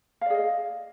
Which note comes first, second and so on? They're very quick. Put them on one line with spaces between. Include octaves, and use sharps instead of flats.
F5 D5 G#4 D#5